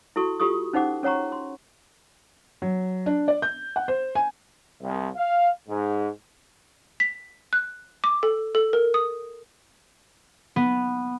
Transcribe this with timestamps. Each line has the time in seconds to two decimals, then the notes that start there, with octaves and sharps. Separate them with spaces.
0.16 E4 F#4 A4 C#6
0.40 F4 G4 A4 C#6 D#6
0.73 C#4 D#4 C5 F#5 D6
1.03 C#4 C#5 F#5 A#5 C#6
1.32 C6
2.62 F#3
3.06 D4
3.28 D5
3.42 G6
3.76 F#5
3.88 C5
4.15 G#5
4.82 C2
5.16 F5
5.69 G#2
7.00 B6
7.53 F#6
8.04 D6
8.23 A4
8.55 A4
8.73 A#4
8.94 D#6
10.56 B3